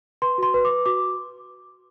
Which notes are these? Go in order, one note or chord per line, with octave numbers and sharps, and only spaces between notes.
B4 C6
F#4 C6
B4
D6
B4
F#4 D6